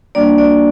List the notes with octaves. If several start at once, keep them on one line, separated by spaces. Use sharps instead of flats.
G3 A#3 D4 F#4 D5
D5